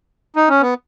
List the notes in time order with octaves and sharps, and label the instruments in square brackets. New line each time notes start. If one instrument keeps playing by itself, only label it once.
[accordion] D#4
C#4
B3